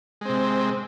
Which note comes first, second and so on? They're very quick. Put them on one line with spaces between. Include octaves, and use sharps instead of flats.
G#3 C4 C3